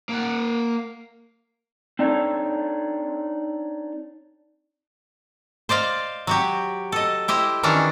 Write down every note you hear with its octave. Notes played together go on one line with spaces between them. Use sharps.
A#3 F#5
C4 D4 D#4 A4 C#5
C5 D5 D#5 F5
F#3 F#4 G4
A4 D#5
E4 G4 C5 D#5
D#3 E3 C#4 D4